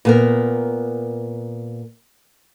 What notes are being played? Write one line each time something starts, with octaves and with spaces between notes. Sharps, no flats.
A#2 B3 A#4